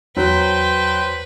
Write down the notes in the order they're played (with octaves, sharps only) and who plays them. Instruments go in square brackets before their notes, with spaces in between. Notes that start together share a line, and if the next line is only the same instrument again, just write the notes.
[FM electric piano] E2 [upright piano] F#3 [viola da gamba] B4 [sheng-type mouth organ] C5 G5